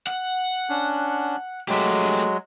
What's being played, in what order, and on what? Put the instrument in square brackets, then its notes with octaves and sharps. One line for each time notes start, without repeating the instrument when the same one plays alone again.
[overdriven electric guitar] F#5
[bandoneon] C#4 D4
[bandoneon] F#3 G#3 [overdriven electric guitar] A3 G4